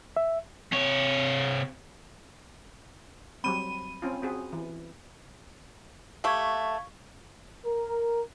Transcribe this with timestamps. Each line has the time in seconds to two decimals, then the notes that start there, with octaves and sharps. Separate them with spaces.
0.16 E5
0.72 C3 C#5
3.44 F#3 G3 C4 B5 D#7
4.02 C4 C#4 F4
4.22 C4 F#4 G#4
4.53 E3
6.24 A3 G4 F5 C#6 G#6
7.65 A#4